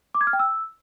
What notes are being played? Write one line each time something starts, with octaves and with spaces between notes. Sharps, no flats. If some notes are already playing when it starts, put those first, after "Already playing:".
D6
G#6
F6
G5
E6